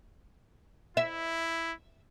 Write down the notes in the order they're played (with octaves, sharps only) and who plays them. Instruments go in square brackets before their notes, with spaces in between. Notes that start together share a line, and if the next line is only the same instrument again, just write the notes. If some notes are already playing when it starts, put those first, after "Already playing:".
[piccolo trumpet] E4 [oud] E5